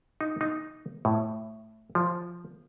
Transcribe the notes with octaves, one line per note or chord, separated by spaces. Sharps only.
D#4
D#4
A2
F3